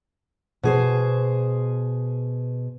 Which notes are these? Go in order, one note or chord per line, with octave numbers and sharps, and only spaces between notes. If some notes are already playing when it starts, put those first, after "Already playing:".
B2 G#4 C5